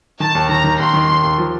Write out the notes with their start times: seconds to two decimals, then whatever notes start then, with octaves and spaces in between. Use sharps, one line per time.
0.20 D#3 A5
0.35 D#2
0.49 D#3 A#5
0.64 D#3
0.79 D#2 C6
0.94 D#3
1.09 D#2
1.23 D#2
1.38 F3